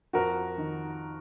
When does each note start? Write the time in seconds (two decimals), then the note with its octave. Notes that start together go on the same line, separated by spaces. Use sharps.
0.13 F2 F#4 A#4
0.58 D#3